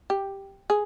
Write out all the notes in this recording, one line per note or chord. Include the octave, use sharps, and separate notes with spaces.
G4
G#4